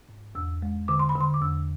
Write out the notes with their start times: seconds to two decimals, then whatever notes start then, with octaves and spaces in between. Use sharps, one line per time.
0.09 G#2
0.35 E2 E6
0.62 G#3
0.88 D3 D6
0.99 C6
1.09 B5
1.15 D3
1.21 C6
1.34 D6
1.42 E2 E6